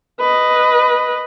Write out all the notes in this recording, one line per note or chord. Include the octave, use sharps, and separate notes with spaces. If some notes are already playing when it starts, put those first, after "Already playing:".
B4 D#5